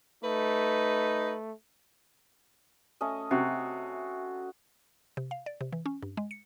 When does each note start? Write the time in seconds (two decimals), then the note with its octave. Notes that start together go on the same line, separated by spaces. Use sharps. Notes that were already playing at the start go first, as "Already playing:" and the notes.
0.24 A3 D#4 B4
3.01 A3 C#4 D#5
3.31 C3 F#4
5.17 C3
5.31 F5
5.46 D5
5.61 C3
5.73 E3
5.86 C#4
6.03 G2
6.17 G#3
6.31 C#7